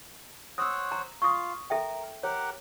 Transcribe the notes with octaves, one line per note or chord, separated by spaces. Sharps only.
C5 C#5 F#5 D#6 E6
A#5
F4 F5 C#6 D#6
A4 A#4 E5 G5
G4 A#4 C#5 F#5